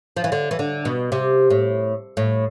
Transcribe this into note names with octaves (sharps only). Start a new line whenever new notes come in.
F3
E3
D3
E3
D3
B2
C3
A2
A2